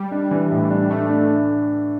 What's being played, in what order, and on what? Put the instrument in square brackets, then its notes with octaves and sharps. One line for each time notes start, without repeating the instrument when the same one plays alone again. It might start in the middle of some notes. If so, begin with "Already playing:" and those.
Already playing: [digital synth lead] G3
[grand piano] D4
E3
A2
D4
[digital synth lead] A3 [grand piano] D4
[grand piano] D4